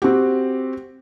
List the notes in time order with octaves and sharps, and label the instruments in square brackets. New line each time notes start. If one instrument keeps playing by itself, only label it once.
[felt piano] C4 F#4 G4